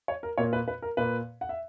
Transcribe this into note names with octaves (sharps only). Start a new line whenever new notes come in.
C#5
A#4
A#2 A#3 C#5
B4
B4
A#4
A#2 A#3 B4
F#5
E5